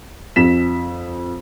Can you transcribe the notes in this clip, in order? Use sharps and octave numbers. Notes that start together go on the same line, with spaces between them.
F2 B6 E7